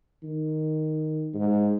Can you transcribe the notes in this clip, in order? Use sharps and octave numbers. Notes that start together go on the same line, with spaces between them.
D#3
G#2